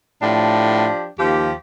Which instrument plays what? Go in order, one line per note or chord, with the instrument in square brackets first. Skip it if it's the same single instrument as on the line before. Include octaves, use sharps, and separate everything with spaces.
[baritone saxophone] A2 [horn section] F3 D4 G4
[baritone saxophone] D#2 [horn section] F3 G4